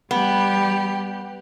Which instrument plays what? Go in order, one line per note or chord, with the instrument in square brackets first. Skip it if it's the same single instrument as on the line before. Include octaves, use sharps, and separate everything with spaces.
[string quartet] G3 G4 [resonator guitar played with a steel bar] B3